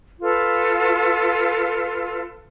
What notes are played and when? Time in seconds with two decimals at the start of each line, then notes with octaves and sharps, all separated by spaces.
0.21 F4 A4 B4